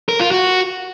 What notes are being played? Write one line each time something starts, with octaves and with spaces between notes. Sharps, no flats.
A#4
F4
F#4